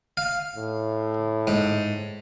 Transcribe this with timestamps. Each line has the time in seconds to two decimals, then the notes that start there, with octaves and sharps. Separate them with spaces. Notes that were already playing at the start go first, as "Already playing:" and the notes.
0.17 F5
0.56 A2
1.47 G#2